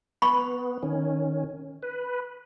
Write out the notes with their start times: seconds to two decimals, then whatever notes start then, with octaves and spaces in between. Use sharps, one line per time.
0.22 B3 B5 C#6
0.83 D#3 C#4
1.83 B4